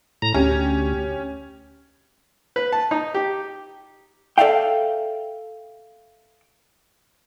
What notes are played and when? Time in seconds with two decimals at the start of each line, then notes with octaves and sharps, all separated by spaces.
0.22 A2 A#5
0.34 D2 C#4 G4
2.56 B4
2.72 A5
2.91 D#4
3.14 G4
4.38 A4 D5 E5 F5 G5